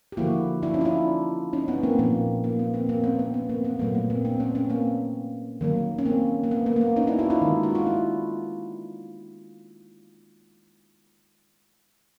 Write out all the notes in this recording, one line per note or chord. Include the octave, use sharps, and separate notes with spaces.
G4
D3 F3 A#3 E4 F#4
D4 E4
C#4 D#4
F4
D4 E4
C#4 D#4
B3 C#4
A#3 C4
A#2 F3 A#3
A#3
B3
A#3 C4
A#3 C4
B3 C#4
B3
B3
A#3 C4
B3
A#2 F#3 A3 A#3
B3
A#3 C4
C4 D4
B3 C#4
B3 C#4
A#3 C4
D#3 F#3 A#3
C#4
A#3 C4
A#3
B3
A#3
A#3
B3
C#4 D#4
D4 E4
E4 F#4
D#4 F4
D#3 G#3
F#4
F4
D4 E4